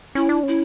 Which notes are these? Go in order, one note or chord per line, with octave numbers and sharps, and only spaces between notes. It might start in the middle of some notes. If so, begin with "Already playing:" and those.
C#4 E4
D4
C#4 E4